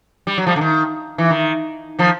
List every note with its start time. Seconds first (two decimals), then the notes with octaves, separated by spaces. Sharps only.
0.27 G3
0.38 F#3
0.47 F3 G3
0.56 D3
0.61 D#3
1.18 E3
1.31 D#3
1.99 D#3 F3